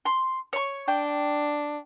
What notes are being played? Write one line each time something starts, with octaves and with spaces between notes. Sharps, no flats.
C6
C#5 C#6
D4 G5